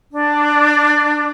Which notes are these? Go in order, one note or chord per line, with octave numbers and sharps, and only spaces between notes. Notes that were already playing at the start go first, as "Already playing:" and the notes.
D4